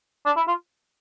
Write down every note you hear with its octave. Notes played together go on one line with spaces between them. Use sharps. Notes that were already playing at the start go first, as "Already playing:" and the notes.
D4
E4
F4